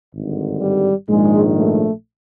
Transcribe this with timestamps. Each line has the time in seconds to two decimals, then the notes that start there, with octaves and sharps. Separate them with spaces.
0.13 G#1 G2 D3
0.61 G3
1.08 A#1 G#2 D#3 G#3
1.57 A3